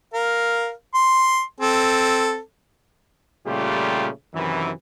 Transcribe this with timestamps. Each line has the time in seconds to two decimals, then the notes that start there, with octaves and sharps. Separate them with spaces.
0.14 A#4 F5
0.95 C6
1.60 C4 A4
3.46 A#2 C#3 G3 A3 F4 G4
4.34 F#2 C3 D#3 E3